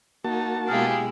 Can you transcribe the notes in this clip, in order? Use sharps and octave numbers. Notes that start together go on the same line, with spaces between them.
A#3 D#4 F#4 A5
B2 G#3 E4 G4 G#4 F5 G#5 F6